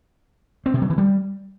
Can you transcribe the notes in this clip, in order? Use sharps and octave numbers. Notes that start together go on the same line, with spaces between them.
C4
C3
F#3
E3
G3